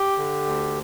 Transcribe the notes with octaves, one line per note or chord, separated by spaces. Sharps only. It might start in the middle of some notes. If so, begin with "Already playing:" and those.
Already playing: G4
D3
D2